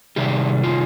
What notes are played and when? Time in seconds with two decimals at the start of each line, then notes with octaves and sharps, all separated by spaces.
0.16 C3 D#3 G3 G4
0.63 F4